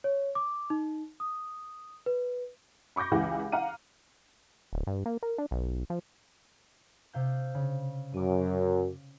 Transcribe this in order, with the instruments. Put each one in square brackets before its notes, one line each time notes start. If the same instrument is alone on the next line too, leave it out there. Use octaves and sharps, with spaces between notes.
[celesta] C#5
D6
D#4
D#6
B4
[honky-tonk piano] B5 C#6 D6 G6 A#6
C#2 C#3 E3 G4 F#5 G#5
F5 F#5 A#5 F6 D#7
[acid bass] D1
G2
A#3
A#4
D4
B1
F3
[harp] C3 F5 G6
C#3
[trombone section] F#2 [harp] D6 D#7